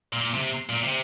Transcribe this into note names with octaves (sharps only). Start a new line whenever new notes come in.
A#2
C3
A#2
C3